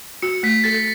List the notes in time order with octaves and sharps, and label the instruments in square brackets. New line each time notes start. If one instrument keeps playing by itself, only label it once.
[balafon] F#4 [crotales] C#7
[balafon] A3 [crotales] B6
[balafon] A4 [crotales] A6